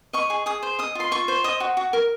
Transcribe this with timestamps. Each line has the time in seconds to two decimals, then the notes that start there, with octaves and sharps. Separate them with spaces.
0.13 D#5 C#6
0.30 G#4
0.46 G#4 D#6
0.62 C5
0.79 D#5 D#6
0.95 F4 C6
1.11 F4 C#6
1.28 C5
1.44 D#5 D#6
1.60 F#4
1.77 F#4
1.93 A#4